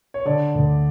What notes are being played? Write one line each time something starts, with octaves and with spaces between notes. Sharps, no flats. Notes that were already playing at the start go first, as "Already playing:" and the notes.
C#5
D3 D5
D2